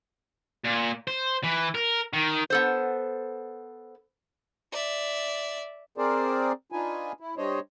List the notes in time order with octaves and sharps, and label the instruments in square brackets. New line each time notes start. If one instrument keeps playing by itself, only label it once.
[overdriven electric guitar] A#2
C5
E3
A#4
D#3
[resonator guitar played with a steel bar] B3 A4 C5
[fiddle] D5 E5
[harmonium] C4 G#4 A#4 C5 D5
D4 D#4 F4 B4 G#5
E4
G3 D4 C5 C#5 D#5